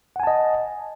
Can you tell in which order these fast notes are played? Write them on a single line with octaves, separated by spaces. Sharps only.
F#5 G#5 A5 D#5